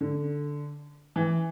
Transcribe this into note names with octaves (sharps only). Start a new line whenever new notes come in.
D3
E3